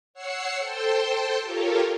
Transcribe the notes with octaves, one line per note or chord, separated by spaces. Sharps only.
C#5 F#5 E6 C7 C#7
A4 C5 G5 A5 C6
F4 G4 A4 A#4 C#5